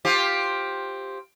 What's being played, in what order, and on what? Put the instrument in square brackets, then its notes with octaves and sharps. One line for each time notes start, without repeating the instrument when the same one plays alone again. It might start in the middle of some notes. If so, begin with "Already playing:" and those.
[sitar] C4 F4 G4